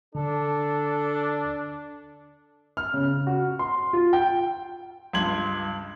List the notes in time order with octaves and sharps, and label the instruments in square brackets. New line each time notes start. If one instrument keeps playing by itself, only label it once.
[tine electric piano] D3 [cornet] D4 [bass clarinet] A4
[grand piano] F6
C#3
F#4
C6
F4
G5
[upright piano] C#2 G2 C6 G#6 F#7